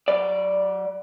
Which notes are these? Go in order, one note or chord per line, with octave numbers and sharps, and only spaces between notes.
F#3 D5